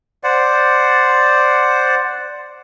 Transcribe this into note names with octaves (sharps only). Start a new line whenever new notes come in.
C5 D5 F#5